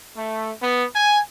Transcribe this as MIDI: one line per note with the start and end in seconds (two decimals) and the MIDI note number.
0.15 0.51 57
0.61 0.85 59
0.94 1.19 80